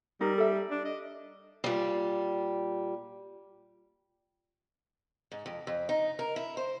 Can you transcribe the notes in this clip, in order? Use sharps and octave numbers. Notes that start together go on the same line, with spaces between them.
G3 D#4 A#4
A4 E5
D4
D#5
A#2 G3
G#2
F2
F2
D#4
A#4
E4
C5